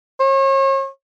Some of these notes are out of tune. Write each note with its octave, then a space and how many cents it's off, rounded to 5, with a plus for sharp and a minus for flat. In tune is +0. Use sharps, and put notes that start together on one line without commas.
C#5 -40